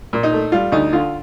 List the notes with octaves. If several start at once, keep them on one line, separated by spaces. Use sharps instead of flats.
A#2
D#4
A3
G3 F4
D2 D#4
D3 F4